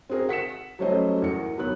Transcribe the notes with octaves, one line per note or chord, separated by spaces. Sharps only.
C4 F#4 G#4 A#4
F#5 B6 C#7 E7
F#3 G3 A3 C#4 C5 D#5
E2 A#4 C#7
D#2 F#3 B3 F#6